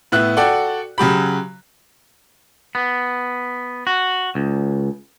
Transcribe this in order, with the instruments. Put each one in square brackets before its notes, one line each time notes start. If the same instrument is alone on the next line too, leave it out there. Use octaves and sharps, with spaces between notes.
[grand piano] A2 B3 E5 F#6
F#4 A4 D5 F#5 G5
C#3 F#3 G4 B5
[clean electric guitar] B3
F#4
C#2